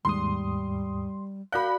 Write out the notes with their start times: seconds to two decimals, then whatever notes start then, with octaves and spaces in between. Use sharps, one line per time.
0.05 D#2 G#2 G3 C6 D#6
1.52 F#4 D5 F5 B5 F#6 G6